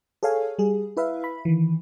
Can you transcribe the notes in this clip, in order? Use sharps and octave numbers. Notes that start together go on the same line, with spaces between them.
G#4 A4 C#5 F5 G#5
G3 G#4
E4 B4 E5 F5
B5
D#3 E3